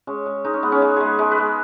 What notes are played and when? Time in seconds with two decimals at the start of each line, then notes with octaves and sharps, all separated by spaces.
0.07 G#3 C#4
0.26 G#3
0.44 G#3 D#4
0.54 C#4
0.63 G#3 B3
0.72 C#4
0.82 G#3
0.97 G#3 G#4
1.06 B4
1.19 G#3
1.32 B4
1.38 G#3